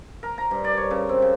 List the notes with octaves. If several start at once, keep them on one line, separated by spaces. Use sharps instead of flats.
A#4
A#5
G2
D5
C#5
C#3
C4
C#3